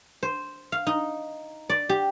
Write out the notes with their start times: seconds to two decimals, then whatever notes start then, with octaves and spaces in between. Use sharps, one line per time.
0.23 C5
0.72 F5
0.87 D#4
1.70 D5
1.89 G4